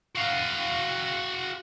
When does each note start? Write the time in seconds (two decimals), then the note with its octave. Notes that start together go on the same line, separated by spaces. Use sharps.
0.16 F#4 F5